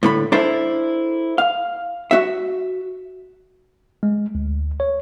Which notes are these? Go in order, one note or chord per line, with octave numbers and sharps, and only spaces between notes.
A2 D3 B5
D4 E4 A4 A#4 C5 E5
F5
F#4 E5
G#3
D2
C#5